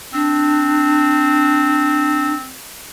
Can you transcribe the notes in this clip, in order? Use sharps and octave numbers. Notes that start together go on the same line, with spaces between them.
C4 D4